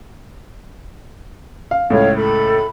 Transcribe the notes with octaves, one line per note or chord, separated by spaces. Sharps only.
F5
C#2 A2 A4 C#5 F5
A4 B5